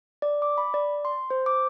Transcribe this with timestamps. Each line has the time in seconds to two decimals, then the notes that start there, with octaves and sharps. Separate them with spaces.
0.22 D5
0.42 D6
0.58 B5
0.74 D5
1.05 C6
1.30 C5
1.46 D6